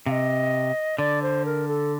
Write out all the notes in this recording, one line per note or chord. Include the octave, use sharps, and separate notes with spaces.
C3 D#5 F5
D3 D5
C5
A#4
A4